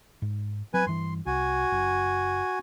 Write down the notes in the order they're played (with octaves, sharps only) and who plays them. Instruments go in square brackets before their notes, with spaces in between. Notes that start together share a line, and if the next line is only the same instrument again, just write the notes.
[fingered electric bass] G#2
[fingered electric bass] F#3 C4 [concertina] B4 G#5
[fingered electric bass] G2 E3 [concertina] C6
[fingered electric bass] C2 [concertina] F#4 G#5
[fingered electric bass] F#1